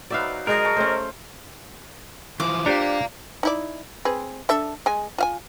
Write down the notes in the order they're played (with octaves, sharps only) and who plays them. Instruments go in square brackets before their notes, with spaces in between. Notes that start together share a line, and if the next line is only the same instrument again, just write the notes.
[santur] F#3 D#4 B4 [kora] D5 E5 F5
[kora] G#3 G#4 [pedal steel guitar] A#4 [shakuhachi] D#5
[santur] A5 A#5 C#6
[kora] A3 C#4 [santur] C5
[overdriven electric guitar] E3 F3 [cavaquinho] D6
[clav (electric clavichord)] D4 G4 C5 [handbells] F4 D5 C#7 [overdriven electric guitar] F5 A#5
[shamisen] D#4 E4 D5
C4 G#4 B4
D4 A4 E5
G#3 G#5
F4 F5 G#5